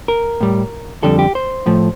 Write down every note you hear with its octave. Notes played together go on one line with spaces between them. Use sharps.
A#4
A2 G3
F2 D3 G3 A4
G4
C5
A2 F3 A3